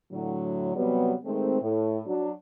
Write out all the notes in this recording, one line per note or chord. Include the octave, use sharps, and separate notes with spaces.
A2 D3 F#3
C3 F#3 G3 B3
D#3 G#3 A3 C4
A2
F#3 D4